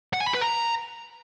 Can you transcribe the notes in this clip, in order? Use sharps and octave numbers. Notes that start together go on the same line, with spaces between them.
F#5
G#5
B5
B4
A#5